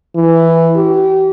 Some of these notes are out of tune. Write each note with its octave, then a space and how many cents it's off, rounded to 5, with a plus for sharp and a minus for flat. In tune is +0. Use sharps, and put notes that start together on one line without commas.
E3 +0
G4 -35